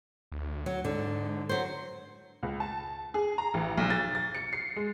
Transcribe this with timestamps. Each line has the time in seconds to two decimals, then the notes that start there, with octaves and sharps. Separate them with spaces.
0.32 D2
0.66 F#3
0.85 G#2 D3
1.49 F#3 C5
2.43 C#2
2.60 A5
3.14 G#4
3.38 A#5
3.54 A1
3.77 B1
3.90 A6
4.15 A6
4.35 C#7
4.53 C7
4.76 G#3